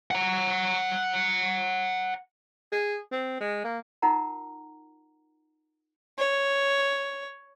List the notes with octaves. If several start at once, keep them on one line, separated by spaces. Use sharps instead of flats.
F#5 A#5
G#4
C4
G#3
A#3
D#4 F4 A#4 F#5 A#5
C#5